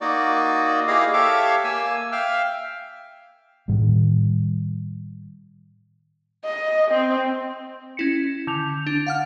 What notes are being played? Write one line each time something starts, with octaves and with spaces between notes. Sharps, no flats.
A#3 D#4 F#4 D5
A#3 E4 G4 G#4 D#5 F5
G4 A4 C#5 E5 F5 D6
A#3 G#5 E6
E5 F5 G5 F6
A2 D#3 G3
D#5
C4
C#4 E4 C#7
D3 G6 F7
D4
F5 F#5 F6